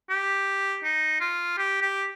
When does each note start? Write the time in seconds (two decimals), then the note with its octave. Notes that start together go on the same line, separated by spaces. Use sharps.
0.10 G4
0.84 D#4
1.20 F4
1.58 G4
1.82 G4